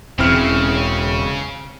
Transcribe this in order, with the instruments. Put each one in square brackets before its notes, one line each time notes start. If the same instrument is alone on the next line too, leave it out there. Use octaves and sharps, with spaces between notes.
[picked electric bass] E1 [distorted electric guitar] C#3 [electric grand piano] C4 E4 F6